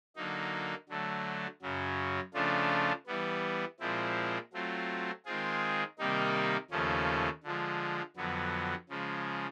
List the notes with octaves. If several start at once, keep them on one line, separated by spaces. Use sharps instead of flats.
D3 F#3 A#3 D#4
D3 F#3 A3
F#2 C#3 F#3
C#3 F3 A3 D4 F4
E3 G3 B3
A#2 F3 G#3 C4 E4
F#3 A3 C4 F4
D#3 G#3 C4 F4 G#4
C3 D#3 G3 A#3 D#4
D#2 C#3 F3 A3 C#4
D3 F3 G#3
F2 D3 F#3 B3
C#3 F3 G#3